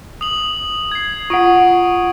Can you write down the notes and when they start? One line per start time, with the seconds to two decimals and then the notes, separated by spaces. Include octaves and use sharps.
0.21 D#6 F#7
0.92 G#6 C7
1.30 F4 F#5 C#6 D#6 D7